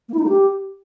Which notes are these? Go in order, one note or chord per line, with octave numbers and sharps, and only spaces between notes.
A#3
E4
D#4
A3
G4